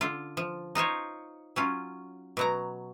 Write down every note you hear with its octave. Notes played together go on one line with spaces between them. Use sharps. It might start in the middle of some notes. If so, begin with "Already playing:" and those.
D3 F4
F3
D#4 F4 C5 C#5
F#3 C#4 F4
B2 F#3 A#5